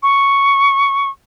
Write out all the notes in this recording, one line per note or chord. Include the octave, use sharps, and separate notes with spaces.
C#6